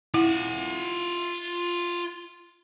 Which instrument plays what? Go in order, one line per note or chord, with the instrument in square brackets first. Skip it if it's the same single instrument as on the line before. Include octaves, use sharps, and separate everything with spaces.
[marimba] E4 [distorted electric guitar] F4 F#5